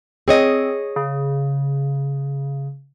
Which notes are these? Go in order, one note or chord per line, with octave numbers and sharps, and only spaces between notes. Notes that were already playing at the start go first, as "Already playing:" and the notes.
C4 G#4 C#5 D#5
C#3